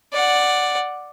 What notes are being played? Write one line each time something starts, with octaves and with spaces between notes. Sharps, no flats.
D5 F#5